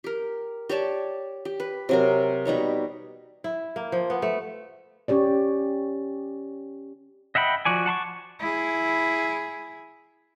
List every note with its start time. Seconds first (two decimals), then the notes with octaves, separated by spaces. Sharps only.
0.04 G4 A#4
0.69 G4 C#5 D5 A5
1.45 G4
1.60 B4
1.89 C3 F#3 A#4
2.45 B2 G3 D#4 C#5
3.44 E4
3.76 A#3
3.92 F3
4.10 B3
4.22 A3
5.08 C#4 G4 C#5 D5
7.35 D#5 E5 F#5 G5 B5
7.65 F3 F#4 D5 G#5
7.86 F#5 A5 C6 C#6
8.39 E4 G#4